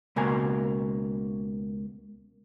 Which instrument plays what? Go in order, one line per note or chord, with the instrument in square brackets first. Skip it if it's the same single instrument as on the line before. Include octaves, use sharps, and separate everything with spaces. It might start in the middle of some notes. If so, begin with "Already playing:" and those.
[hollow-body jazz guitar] C#2 B2 A#3 G#5